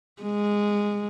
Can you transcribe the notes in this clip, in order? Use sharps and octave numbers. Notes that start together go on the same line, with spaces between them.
G#3